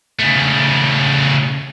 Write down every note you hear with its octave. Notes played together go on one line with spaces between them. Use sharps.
C#3 A3